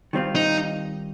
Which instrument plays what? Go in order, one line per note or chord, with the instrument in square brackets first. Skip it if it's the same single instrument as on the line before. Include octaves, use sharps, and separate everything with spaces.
[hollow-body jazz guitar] D#3 G3 C4 F4
[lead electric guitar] D#4